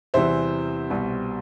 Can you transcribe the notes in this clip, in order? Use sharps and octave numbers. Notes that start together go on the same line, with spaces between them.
E2 C3 E3 G3 C5 E5
C2 B2 G3